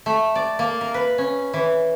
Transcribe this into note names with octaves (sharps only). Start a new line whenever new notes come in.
A3
D5
A#3
A#4
B4
C#4
E3